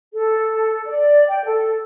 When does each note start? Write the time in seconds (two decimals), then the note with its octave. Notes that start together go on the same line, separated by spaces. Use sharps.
0.13 A4
0.87 D5
1.28 G5
1.45 A4